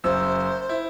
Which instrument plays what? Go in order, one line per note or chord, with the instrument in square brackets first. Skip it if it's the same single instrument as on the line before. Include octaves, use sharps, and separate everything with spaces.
[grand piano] F#1 F#2 E6 [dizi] C5
[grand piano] E4